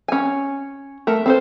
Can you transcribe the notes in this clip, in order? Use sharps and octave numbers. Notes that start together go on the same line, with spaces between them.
C#4 G#5
A3 A#4
C4 A4 C5